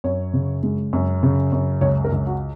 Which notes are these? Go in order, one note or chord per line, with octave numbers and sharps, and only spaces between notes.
F#2 C#5
C#3
G#3
F#2
C#3
F#2
C#2 C#5
A#4
C#2
F#4